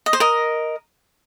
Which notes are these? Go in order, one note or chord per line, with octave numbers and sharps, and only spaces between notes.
D#5
C5
A#4 D#5